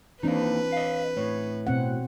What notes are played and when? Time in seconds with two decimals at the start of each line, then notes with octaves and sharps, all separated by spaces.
0.23 E3 A#3 C4 D4 D#4 B4
0.72 D#5 F5
1.17 A2 C#5
1.67 B2 C4 F#5